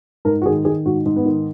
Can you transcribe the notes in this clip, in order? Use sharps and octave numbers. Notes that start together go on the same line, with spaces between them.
G#2 A#4
F#4
D#3 G#4
D#3 G#4
G#2 F#4
G#2
B3
D#3